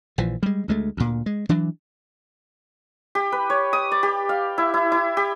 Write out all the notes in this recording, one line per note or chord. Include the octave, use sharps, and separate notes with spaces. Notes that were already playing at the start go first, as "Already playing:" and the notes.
A#1 E3 F3
G3 G#3
D2 G#3 A3
D2 A#2
G#3
E3 F#3 D4
G4
B4
C#5
D#6
D5
G4
F5
E4
E4
E4
G4